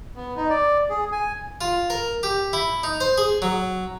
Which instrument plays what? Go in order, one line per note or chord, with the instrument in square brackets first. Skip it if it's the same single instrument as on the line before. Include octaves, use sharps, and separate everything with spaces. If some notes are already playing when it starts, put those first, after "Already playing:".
[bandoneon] B3
D#4
D5
G#4
G#5
[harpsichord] F4
A#4
G4
E4
D#4
C5
G#4
F#3